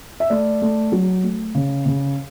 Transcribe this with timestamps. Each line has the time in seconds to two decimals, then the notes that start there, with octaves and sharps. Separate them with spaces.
0.20 E5
0.30 A3 D5
0.62 A3
0.92 F#3
1.23 A3
1.55 C#3
1.86 C#3